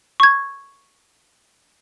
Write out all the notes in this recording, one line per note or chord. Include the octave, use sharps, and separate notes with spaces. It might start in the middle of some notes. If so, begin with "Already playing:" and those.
C#6 G#6